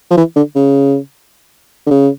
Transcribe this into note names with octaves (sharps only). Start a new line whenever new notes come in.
F3
E3
D3
C#3
D3
C#3